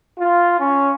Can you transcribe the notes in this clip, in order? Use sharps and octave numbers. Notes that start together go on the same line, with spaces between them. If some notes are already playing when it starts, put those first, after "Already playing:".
F4
C#4